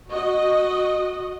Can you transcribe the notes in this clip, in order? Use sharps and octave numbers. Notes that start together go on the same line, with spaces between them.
F#4 D#5